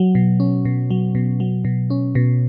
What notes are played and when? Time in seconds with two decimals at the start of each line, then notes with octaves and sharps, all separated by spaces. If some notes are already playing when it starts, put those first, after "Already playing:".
Already playing: F#3
0.15 B2
0.40 C#4
0.65 B2
0.90 F#3
1.15 B2
1.40 F#3
1.65 B2
1.90 C#4
2.15 B2